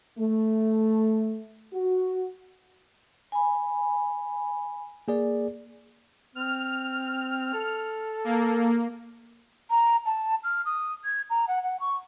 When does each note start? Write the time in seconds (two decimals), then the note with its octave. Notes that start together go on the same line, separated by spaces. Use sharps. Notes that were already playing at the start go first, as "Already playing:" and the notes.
0.19 A3
1.74 F#4
3.32 G#5 B5
5.08 A#3 G#4 D5
6.35 C4 F6
7.54 A4
8.24 A#3
9.70 A#5
10.05 A5
10.43 F6
10.65 D#6
11.04 G#6
11.30 A#5
11.48 F#5
11.63 F#5
11.80 C#6